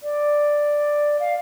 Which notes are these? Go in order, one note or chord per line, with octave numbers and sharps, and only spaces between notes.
D5
F5